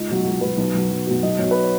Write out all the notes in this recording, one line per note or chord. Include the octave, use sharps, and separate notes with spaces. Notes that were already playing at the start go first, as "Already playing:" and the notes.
Already playing: C#2 D#4
B2 F#3
C#2 F#4
B2 F#3 B4
B1
B2 F#3
B1
B2 F#3
B1 D#5
B2 F#3 C#5
B4
C#5